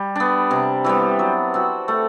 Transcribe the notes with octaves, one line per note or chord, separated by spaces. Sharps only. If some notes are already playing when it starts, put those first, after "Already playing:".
Already playing: G3
B3 D4
C3
E3 G3 B3
F#3
C4 F#4
A3